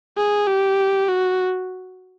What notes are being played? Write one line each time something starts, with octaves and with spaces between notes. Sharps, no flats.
G#4
G4
F#4